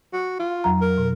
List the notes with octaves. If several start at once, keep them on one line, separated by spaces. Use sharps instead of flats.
F#4
F4
F2 F#3 A#5
A#4
B2